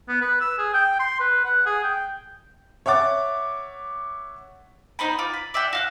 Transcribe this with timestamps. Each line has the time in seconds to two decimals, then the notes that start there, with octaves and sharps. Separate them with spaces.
0.09 B3
0.21 B4
0.41 E6
0.59 G#4
0.74 G5
0.99 C6
1.20 B4
1.45 F#5
1.66 G#4
1.83 G5
2.86 C#5 E5 F#5 D6 A6
4.99 B3 D#4 C5 B5
5.19 F4 D6
5.34 B5
5.54 D5 E5 F#5 G5
5.73 F#4 F5 F#6